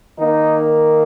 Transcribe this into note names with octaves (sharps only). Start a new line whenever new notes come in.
D#3 A#3 D#4